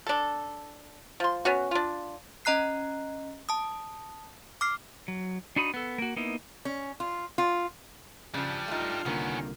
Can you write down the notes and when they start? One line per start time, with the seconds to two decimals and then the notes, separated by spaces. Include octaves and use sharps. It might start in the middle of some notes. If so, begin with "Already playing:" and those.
0.07 D4 A4
1.20 F3 C6
1.45 B3 C#4 F#4
1.71 D4 F4
2.45 C#4 D#5 A#5 F#6 C7
3.49 A5 D#6
4.61 D6 F6 C7
5.08 F#3
5.56 D4 D#4 F#4 B5 D#6
5.74 B3 A4
5.98 A#3 F#4
6.17 A#3 B3 D#4 E4
6.65 C#4
7.00 F4
7.38 F4
8.34 C#3 F3 G3 D4
8.68 A3 D#4 F4
9.06 C2 D3 D#3 A#3 B3 C#4